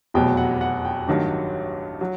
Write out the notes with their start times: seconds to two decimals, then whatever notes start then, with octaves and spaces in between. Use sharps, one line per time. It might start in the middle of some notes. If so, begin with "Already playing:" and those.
0.14 F1 E2 B2 F#3 G5
0.37 F#5
0.61 F#5
0.85 G5
1.08 A1 G2 D#3 F#3
2.01 F#3